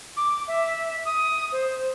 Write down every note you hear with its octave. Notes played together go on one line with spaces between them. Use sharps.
D6
E5
D#6
C5